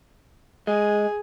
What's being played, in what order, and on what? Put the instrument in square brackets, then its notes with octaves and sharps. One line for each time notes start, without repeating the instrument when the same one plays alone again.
[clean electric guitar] G#3 [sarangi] G#4